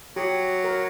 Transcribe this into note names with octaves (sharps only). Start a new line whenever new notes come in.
F#3 G4
A#4